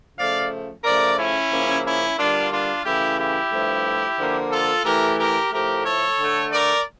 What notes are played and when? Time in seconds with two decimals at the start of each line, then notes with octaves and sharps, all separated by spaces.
0.17 C#3 F3 A3 D5 F5
0.84 C#3 F3 A3 A#4 D5
1.18 C#4 E4
1.51 C#3 F3 A#3
1.84 C#4 E4
2.18 D3 G3 A#3 D4 F4
2.51 D4 F4
2.84 C#3 E3 A3 E4 G4
3.18 E4 G4
3.51 G2 F3 A3
4.18 D3 F3 A#3
4.52 F4 A4
4.84 A2 E3 A3 G4 A#4
5.18 G4 A#4
5.51 A2 F3 A3 G4 A#4
5.85 A4 C#5
6.19 D3 A3
6.51 A#4 D5